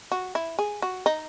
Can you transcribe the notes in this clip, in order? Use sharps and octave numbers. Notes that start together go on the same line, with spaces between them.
F#4
E4
G#4
F#4
D#4